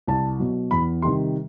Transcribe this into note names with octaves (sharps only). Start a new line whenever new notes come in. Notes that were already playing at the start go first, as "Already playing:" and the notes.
C2 A5
B2 F#3
E2 B5
C3 D#3 G3 C6